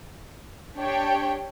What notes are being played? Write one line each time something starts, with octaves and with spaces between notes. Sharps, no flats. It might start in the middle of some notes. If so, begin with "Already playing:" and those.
D4 G4 C#5 G5